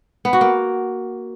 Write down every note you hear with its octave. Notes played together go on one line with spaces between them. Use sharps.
B3
F#4
A#3